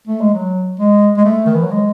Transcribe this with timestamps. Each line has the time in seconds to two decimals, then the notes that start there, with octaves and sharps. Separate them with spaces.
0.07 A3
0.21 G#3
0.34 F#3
0.80 G#3
1.17 G#3
1.25 A3
1.46 D#3
1.55 E3
1.63 F#3
1.71 G#3